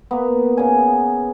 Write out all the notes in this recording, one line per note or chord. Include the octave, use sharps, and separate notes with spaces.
A#3 B3
C#3 G#5